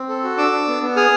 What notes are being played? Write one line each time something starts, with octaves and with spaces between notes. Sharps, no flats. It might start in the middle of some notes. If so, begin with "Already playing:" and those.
Already playing: C4
A4
F#4
D4 D6 E6
D4
B3
B3
G#4 D#6 F6